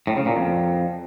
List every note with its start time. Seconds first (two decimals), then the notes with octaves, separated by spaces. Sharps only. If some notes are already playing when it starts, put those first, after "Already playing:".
0.07 A2
0.17 C#3
0.26 A#2
0.36 F2